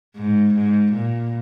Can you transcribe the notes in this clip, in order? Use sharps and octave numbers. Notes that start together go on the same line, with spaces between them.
G#2
G#2
A#2